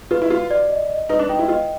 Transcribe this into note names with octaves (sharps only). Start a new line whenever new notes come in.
F4 B4
E4
F4 F#4
D5
D#5
D#5
D#4 B4
D4
D#4 G5
E4
F4 D#5